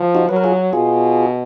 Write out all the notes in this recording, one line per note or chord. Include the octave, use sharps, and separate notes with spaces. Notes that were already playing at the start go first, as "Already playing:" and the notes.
Already playing: F3
D#4 F#4
F#3 B4
A#4
F4 G#4
B2 F4 G#4